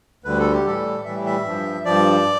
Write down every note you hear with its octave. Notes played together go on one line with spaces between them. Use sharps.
D2 D3 G3 B4
A4
G4
A2 E3 G3 A4
A2 E3 G3 E5
E5
G2 F3
G2 F3 D5